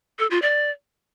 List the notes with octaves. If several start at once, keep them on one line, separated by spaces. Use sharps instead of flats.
A4
F4
D5